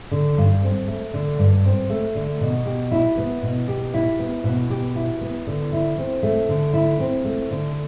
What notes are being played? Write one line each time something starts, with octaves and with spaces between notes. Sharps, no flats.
D3
G2
C4
A3
D3
G2
C4
A3
D3
B2
G4
E4
B3
B2
G4
E4
B3
B2
G4
E4
B3
D3
E4
C4
A3
D3
E4
C4
A3
D3